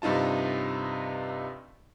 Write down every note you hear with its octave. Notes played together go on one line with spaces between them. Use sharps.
G2 C3 D#4 F4 A5